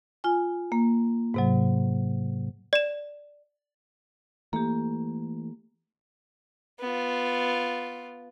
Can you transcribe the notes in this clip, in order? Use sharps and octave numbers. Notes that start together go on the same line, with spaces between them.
F4 G#5
A#3
G#2 C3 F#3
D5 E7
E3 A3 A#3 G4
B3 F4